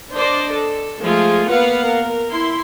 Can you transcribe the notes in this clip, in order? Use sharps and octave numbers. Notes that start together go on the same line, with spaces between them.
D4 C5 D5 D#5
A4
F3 G#3 A3 F4 G#4
A#3 B3 B4 F5 F#5
A#4
E4 C6